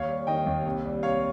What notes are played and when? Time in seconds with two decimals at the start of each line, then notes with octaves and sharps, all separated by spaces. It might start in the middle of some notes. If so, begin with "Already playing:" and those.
Already playing: D#2 C#5 F5
0.08 G3
0.27 D#3 D#5 G5
0.46 D#2
0.65 C2
0.85 G3
1.03 C3 C#5 F5